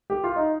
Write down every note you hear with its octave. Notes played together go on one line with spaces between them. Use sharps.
G4
F4
D#4